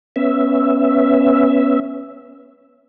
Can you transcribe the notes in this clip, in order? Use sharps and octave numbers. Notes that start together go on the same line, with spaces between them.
B3 C#4 E5